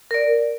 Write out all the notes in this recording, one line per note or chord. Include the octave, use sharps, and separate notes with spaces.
A#4 D5